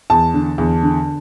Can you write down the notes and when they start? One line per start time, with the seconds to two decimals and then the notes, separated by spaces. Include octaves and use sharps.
0.10 E2 A5
0.34 D3
0.58 E2
0.83 D3